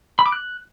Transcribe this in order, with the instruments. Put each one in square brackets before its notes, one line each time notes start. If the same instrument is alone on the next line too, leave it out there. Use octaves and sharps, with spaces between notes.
[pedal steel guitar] B5
D6
F#6